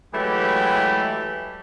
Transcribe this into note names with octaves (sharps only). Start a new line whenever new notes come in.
E3 F#3 G#3 A3 E4 G4